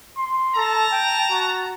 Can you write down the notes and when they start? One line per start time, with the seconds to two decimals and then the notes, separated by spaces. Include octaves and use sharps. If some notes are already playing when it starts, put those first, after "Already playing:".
0.18 C6
0.56 A4 A5 A#5
0.92 G5
1.32 F#4